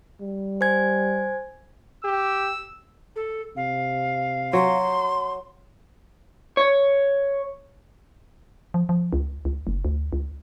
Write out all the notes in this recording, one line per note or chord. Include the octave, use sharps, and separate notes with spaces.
G3
C5 G#5 G#6
G4 E6
A4
C3 F5
F#3 C6
C#5
F3
F3
C#2
C#2
F#1
D2
C#2